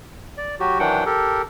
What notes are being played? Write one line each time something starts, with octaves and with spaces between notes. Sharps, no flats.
D5
F#3 F#4 G4
D#3 E3 F#3 D4 F#5 G5
G4 A4 A#4